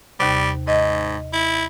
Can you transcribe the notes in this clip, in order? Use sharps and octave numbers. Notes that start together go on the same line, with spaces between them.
D#2 C3 G3
G#2 D#5
E4